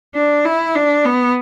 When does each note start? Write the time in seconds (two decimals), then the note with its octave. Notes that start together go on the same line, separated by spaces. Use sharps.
0.15 D4
0.45 E4
0.75 D4
1.05 B3